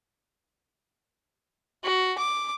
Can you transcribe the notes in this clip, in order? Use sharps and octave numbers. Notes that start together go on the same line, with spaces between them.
F#4
D6